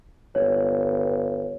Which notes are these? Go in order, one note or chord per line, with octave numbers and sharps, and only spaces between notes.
G1 C#5